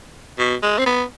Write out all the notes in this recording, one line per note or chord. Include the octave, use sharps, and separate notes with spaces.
B2
G#3
C4
B3